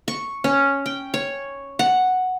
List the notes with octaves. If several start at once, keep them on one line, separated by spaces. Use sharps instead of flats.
C#6
C#4
G5
C#5
F#5